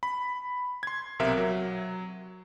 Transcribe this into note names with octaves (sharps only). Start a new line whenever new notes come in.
B5
C6 G#6
B1 C3 A#4 E5
F#3